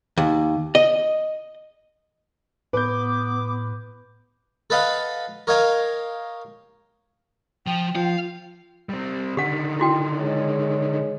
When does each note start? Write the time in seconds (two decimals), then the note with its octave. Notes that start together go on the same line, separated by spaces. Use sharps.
0.17 D#2
0.75 D#5
2.73 A2 B3 B4 D6 G6
4.70 A4 B4 D#5 F5 F#5
5.47 A#4 C#5 D#5 F5 G5 G#5
7.67 F3 G5
7.95 F3 F5
8.89 G3 C4
9.37 D3 D#3 G4 F#5
9.80 E4 F#4 G5
10.18 G#3 G#4 C#5